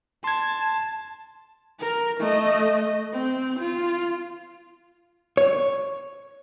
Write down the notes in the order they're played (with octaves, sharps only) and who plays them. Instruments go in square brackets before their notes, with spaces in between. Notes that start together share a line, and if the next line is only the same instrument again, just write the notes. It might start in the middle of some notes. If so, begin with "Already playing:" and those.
[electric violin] A5 [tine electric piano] C6 G#6
[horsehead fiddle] A#4
A3 D#5
C4
F4
[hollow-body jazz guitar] C#5